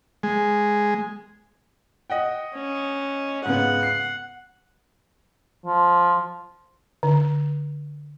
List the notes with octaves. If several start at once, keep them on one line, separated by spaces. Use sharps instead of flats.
G#3
D#5 F#5 G5
C#4
G#2 C#3 B3 F#5
C7
F3
D3